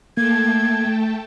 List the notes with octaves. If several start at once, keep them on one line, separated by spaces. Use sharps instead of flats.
A3 A#3 G5 A5 G#6